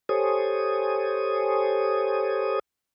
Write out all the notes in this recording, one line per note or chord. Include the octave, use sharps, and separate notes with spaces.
G4 A4 C5 C#5 G#5 D#6